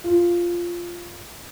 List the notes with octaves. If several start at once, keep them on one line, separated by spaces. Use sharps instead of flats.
F4